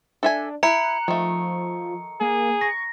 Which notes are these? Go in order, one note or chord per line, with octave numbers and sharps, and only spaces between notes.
D4 A4 E5 G#5
E4 A#5 F#6 C#7
D#3 F3 A3
A#3 G#4
C#6 A#6